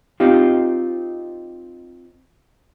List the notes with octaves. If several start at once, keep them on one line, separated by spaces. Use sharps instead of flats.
C4 D#4 F4 G4